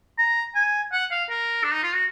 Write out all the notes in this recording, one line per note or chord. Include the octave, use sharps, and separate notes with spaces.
A#5
G#5
F#5
F5
A#4
D4
D#4
F4
F#4